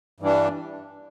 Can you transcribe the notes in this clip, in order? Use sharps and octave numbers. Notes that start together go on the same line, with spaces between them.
G2 E3 G3 D4